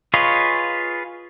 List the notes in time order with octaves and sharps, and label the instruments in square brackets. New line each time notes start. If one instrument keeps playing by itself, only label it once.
[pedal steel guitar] F4 G#4 B4 C#5 D#5